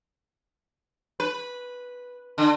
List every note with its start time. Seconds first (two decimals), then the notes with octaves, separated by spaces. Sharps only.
1.20 B4
2.38 D3